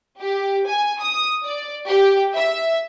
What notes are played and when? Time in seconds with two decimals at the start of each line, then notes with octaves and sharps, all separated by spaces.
0.20 G4
0.66 G#5
0.99 D#6
1.45 D5
1.87 G4
2.33 E5